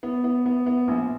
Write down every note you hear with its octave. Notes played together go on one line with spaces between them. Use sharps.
B3
B3
B3
B3
A#1